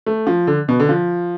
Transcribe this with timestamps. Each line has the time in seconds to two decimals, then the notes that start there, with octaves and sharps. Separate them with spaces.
0.06 A3
0.27 F3
0.47 D3
0.68 B2
0.80 D3
0.89 F3